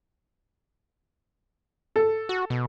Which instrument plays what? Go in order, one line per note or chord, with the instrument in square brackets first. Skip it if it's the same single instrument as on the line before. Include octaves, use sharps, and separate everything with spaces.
[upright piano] A4
[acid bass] F#4
B2